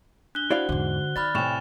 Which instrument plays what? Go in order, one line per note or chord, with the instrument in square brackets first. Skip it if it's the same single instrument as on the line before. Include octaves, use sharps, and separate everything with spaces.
[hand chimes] D4 [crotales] F#6 G7
[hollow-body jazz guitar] E4 D5 F5 [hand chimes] F#4 C5 F#5
[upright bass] E2 G#2 [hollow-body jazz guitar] D3
[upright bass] D#3 [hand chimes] D5 B5 F6 [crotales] A6
[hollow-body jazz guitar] A2 C3 [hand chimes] G5 G#5 [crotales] C#6 E7 F7